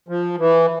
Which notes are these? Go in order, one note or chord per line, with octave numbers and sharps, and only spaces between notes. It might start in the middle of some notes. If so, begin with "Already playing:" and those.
F3
E3